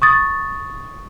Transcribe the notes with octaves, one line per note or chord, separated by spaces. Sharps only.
C#6 D#6 A6